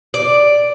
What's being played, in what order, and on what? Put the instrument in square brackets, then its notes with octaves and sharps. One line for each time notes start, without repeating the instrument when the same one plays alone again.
[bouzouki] D5